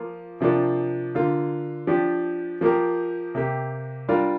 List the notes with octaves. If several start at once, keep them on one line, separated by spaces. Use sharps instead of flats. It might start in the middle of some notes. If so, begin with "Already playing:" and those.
Already playing: F3 A#3 F4
C3 F3 A#3 D4
D3 A#3 F4
F3 D4 G4
F3 A#3 G4 A#4
C3 A#3 G4
G3 D4 F4 A#4